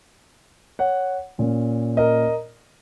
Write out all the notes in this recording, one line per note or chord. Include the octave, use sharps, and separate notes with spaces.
C#5 F#5
A#2 A#3 C#4
A#4 D#5